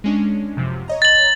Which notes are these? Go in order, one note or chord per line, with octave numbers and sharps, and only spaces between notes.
G#3 C#4 D4
F#2 C3 F3
C#5 D#5 A#5
A6 F#7